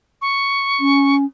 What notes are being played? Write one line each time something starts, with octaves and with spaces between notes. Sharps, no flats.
C#6
C#4